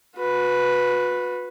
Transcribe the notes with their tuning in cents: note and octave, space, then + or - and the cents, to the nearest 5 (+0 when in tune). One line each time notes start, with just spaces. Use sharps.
F#4 -40 B4 +0